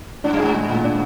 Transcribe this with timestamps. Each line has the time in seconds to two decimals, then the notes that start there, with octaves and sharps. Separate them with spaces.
0.24 G#2 D4
0.33 G2
0.39 G#2 G#4
0.54 G#3
0.69 A#2
0.84 D4